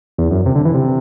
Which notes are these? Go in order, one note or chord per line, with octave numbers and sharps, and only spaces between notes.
E2
F#2
C3
D3
E3
C3